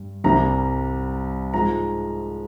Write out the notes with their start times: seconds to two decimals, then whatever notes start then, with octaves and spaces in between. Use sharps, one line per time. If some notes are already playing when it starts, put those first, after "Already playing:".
Already playing: G2
0.24 C2 C3 G3 A#5
1.53 G#2 F3 G#3 A#5